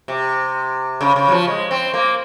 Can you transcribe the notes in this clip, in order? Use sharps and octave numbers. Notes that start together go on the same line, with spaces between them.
C3
C#3
C#3
F#3
F3
G#3
C4
A#3